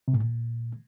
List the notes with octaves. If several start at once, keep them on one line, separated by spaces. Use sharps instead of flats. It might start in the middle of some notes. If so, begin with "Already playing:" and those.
C3
A2
A#2